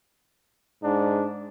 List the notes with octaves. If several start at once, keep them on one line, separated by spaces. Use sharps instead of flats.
G#2 D4